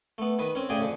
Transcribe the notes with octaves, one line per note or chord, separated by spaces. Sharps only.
A3 B3
D#3 B4
C4 C#4
A2 C#3 G#4 D5 G5 G#5
F2 D3